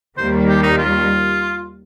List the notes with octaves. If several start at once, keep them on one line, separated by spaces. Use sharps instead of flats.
D#2 D#3 G3 A#3 C5
G4
D#4
F4